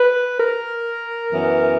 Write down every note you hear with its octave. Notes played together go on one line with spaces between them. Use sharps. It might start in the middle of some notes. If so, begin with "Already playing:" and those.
Already playing: B4
A#4
F#2 E3 B3